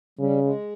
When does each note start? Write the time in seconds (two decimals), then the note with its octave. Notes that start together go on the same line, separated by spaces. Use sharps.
0.19 C#3 G3
0.42 G#3